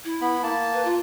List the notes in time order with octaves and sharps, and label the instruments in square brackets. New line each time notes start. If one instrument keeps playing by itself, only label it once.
[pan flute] E4
[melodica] B3 B5
A#3 A5
[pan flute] B4
F4